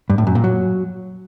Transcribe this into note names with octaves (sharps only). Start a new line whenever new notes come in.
G2
A2
F#2
A#2
F#3